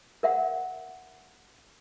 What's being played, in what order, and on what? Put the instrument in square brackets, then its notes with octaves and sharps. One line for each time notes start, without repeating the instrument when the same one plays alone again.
[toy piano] A#4 E5 F#5